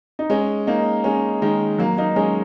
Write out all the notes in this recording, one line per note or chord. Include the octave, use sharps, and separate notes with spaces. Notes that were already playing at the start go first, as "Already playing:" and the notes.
D#4
G#3 C#4
A#3 D#4
G#3 C#4
D#3 G#3
F#3 A#3
A#3 D#4
G#3 C#4